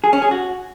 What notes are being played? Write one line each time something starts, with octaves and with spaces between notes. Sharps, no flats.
G#4
C#4
G#4
F#4